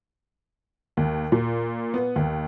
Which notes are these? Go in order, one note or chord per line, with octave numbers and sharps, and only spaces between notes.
D#2
A#2
B3
D#2